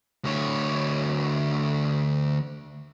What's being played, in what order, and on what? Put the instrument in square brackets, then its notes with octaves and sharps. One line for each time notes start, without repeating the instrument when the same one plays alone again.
[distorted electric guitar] D2 C#5